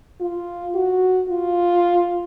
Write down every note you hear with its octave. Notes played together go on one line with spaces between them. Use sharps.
F4
F#4
F4